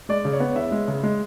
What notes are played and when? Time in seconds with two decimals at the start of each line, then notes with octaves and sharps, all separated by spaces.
0.09 G#3 D5
0.25 C#3
0.33 C#5
0.40 B3
0.56 E2 E5
0.72 G#3
0.88 C#3
1.03 G#3